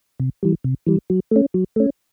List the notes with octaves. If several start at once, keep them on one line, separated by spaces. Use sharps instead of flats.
C3
E3 G3
C3
E3 G3
F#3
A3 C#4
F#3
A3 C#4